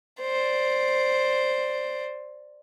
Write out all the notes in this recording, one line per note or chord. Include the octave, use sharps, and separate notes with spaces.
C5 D5